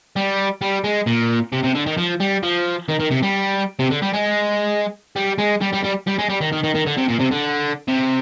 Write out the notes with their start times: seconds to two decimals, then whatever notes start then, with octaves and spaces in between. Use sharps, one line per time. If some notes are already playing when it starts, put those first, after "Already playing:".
0.16 G3
0.61 G3
0.84 G#3
1.07 A#2
1.52 C3
1.63 C3
1.75 D3
1.86 D#3
1.98 F3
2.20 G3
2.43 F3
2.89 D#3
3.00 D#3
3.11 C3
3.23 G3
3.79 C3
3.91 D3
4.02 G3
4.14 G#3
5.16 G3
5.38 G#3
5.61 G3
5.73 G3
5.84 G3
6.07 G3
6.18 G#3
6.29 G3
6.41 D#3
6.52 D#3
6.64 D#3
6.75 D#3
6.86 D3
6.98 C3
7.09 A#2
7.20 C3
7.32 D3
7.88 C3